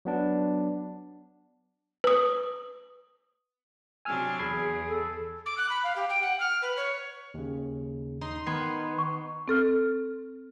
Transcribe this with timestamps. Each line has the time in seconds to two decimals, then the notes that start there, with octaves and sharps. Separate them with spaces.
0.05 F#3 B3 D4
2.04 B4 D#6
4.05 C3 F#3 D4 G#5 E6 F6
4.39 E2 G#4 B5 G#6 C7
4.88 A4
5.46 D6
5.58 F#6
5.70 B5
5.83 F5
5.96 G4
6.09 G5
6.22 F#5
6.40 F6
6.62 B4
6.77 C#5
7.34 D#2 C#3
8.21 D#4 C6
8.46 D#3 B3 C6 G#6 C7
8.98 C#6
9.48 C4 A4 F6